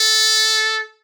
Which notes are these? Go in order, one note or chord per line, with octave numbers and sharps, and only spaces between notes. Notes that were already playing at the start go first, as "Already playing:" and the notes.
Already playing: A4